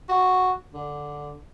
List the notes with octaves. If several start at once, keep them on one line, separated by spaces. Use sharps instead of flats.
F#4
D3